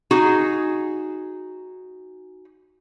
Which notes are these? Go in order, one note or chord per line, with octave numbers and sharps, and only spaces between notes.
D#4 F#4 G#4